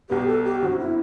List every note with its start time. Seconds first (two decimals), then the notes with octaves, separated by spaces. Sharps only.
0.10 B1 B2 G3 B3 G4
0.27 A4
0.44 G4
0.61 G1 F#2 D3 F#3 C4 F#4
0.79 E4